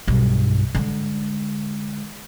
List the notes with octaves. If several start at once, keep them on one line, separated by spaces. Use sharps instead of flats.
B1 G2
D3 G#3